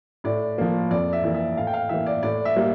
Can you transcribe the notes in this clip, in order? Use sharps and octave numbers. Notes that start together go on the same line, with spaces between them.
A2 D5
F3 A#3
F2 D5
E5
E3 A#3
E5
A2 F5
G5
F5
E3 A#3 E5
D5
A2 D5
E5
G3 A#3